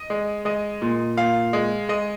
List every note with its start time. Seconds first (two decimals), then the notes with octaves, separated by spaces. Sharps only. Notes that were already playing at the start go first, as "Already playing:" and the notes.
Already playing: D#5
0.10 G#3
0.45 G#3 D#5
0.82 A#2
1.17 A#2 F5
1.53 G#3
1.89 G#3 D#5